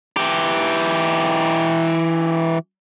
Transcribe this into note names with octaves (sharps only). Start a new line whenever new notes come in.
E3 G4